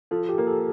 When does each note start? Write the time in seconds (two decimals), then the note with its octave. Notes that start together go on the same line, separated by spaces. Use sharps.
0.11 F3 A4
0.29 G4
0.38 A#3
0.47 A4